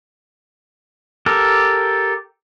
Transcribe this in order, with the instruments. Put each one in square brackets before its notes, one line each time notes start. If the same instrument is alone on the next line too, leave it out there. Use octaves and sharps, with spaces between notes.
[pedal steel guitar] G4 A4 A#4